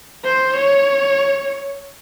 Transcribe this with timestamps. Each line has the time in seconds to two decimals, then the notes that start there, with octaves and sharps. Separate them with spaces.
0.24 C5
0.56 C#5